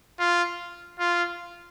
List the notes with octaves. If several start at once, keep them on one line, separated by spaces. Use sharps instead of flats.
F4
F4